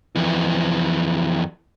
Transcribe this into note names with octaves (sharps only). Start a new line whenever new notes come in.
F2 E3